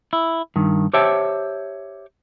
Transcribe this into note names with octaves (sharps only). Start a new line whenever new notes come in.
E4
G2 D#3
G4 C5 C#5 E5 G5 A5